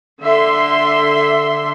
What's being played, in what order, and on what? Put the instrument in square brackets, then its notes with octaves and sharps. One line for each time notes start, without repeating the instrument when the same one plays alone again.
[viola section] D3 E5 C6